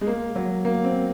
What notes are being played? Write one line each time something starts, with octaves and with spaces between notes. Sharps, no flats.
G#3
A#3
F#3
A#3
C4